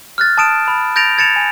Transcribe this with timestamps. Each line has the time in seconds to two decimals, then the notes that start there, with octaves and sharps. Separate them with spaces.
0.18 F6 F#6 A6
0.38 A5 D#6 D7 E7
0.68 B5
0.96 G6 A6 A#6 D7 F7
1.18 G#6 A6 C#7 E7 F7
1.36 G#5